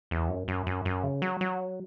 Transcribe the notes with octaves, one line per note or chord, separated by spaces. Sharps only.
E2
F#2
F#2
F#2
F#2
C#3
F#3
F#3